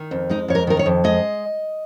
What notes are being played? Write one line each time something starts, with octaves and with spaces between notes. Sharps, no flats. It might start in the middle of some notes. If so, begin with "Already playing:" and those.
Already playing: D#3
F2
G#3 D#4
F2 C#5
A#4
D#3 A#4
C#5
F2
G#3 D#5